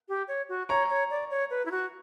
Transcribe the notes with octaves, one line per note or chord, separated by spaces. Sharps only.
G4
C#5
F#4
C#5 A#5 C#6
C#5
D5
C#5
B4
E4
F#4